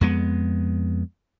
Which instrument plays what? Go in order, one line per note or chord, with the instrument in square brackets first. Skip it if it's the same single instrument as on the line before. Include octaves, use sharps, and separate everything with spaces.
[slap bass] F2 G#3 B3